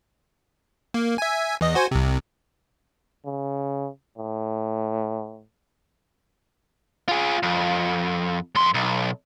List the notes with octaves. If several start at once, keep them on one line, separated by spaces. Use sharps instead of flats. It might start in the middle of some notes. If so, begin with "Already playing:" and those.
A#3
E5 G#5
E2 D#5
F#4 C5 G#5
C2 C3
C#3
A2
F4 G#4
F2
F2 C6
B1